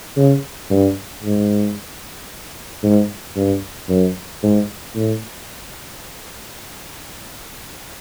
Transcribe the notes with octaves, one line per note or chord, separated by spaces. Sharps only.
C#3
G2
G#2
G#2
G2
F#2
G#2
A2